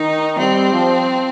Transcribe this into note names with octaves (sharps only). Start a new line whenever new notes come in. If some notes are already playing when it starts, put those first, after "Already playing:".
Already playing: D#3 D#4
G3 C4
F3